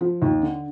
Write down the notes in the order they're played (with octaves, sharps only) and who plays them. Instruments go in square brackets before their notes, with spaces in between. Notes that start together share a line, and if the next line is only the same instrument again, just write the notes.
[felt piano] F3
D#2
D3